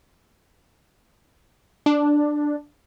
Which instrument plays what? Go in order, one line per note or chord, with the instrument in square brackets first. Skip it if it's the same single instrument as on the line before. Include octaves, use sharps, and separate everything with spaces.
[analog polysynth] D4